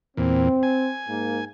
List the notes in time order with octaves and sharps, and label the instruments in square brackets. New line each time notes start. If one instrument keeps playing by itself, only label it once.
[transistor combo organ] E2 A#2 [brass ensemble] C4
[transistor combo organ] G#5
[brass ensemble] G#2 A#3